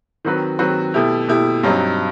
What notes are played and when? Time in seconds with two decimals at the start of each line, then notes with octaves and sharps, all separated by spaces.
0.25 D#3 F#3 C4 F#4 B4
0.59 D#3 F#3 C4 F#4 B4
0.94 B2 A3 E4 G4
1.28 B2 A3 E4 G4
1.63 G2 F#3 C4 D#4